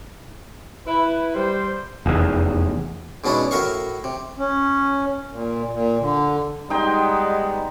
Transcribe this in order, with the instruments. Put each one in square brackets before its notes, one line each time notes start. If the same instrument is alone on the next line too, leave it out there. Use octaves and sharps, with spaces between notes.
[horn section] E4 B4
G3 C5
[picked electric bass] F1 E2
[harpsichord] G#2 B2 C#4 D4 E4
A2 F#4 A#4 E5 F5 C#6
C3
[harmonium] C#4
A#2
A#2
D3
[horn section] G3 G#3 B3 [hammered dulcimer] D#4 G5 C6